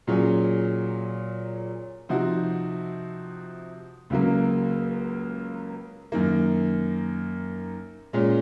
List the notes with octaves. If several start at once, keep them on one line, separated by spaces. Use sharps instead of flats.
A#2 F#3 C#4 G#4 C#5
C3 F3 C4 D#4 F#4
C#2 C#3 F#3 A#3
F#2 D#3 A#3
A#2 G#3 C#4